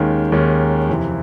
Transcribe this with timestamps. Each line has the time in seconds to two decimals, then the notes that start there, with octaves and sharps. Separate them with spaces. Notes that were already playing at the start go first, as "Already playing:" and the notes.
Already playing: D#2 D#3 G#3 C#4
0.32 D#2 D#3 G#3 C#4
0.89 F2 C3 E3